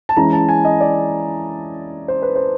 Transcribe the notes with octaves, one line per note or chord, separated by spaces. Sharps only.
A5
E3 G#3 C#4 E4 A#5
A5
G#5
D#5
D5
C5
B4
C5